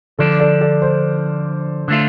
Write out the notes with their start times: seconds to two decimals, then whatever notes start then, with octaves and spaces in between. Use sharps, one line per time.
0.18 D3 F3 D4 A4 D5
0.40 A4 D5
0.61 A4 D5
0.82 C5
1.88 D3 A3 F4